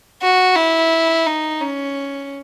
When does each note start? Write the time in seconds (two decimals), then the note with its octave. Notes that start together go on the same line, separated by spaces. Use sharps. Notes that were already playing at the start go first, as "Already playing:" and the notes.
0.22 F#4
0.56 E4
1.27 D#4
1.61 C#4